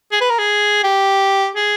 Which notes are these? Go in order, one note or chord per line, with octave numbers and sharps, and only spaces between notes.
G#4
B4
A#4
G#4
G4
G#4